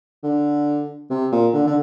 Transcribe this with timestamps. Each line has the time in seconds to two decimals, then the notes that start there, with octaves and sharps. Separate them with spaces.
0.23 D3
1.10 C3
1.32 A#2
1.53 D3
1.67 D3